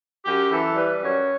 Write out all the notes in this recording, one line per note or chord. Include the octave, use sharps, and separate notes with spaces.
F#2 G4
E3 A4
G3 B4
F#2 C#5